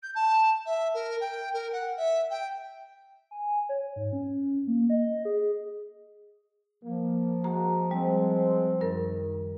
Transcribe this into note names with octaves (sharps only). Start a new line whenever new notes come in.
G6
A5
E5
A#4
G5
A#4
F#5
E5
G5
G#5
C#5
G#2
C#4
A#3
D#5
G#4
F3 A#3
G#3 A#3 F#4 A#5
G3 G#3 C4
F#2 D#3 A#4